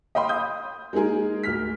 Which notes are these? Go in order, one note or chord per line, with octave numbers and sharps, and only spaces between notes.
D#5 F5 G5 B5 C6
F5 D#6 G6
G#3 A#3 D#4 G#4 A#4
D2 F6 B6